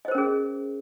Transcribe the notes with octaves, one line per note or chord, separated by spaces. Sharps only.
C#4 G#4 A#4 C5 D#5